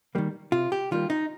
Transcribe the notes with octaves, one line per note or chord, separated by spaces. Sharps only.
D#3 G3 A#3
C3 F4
G4
D#3 G3 A#3 F4
D#4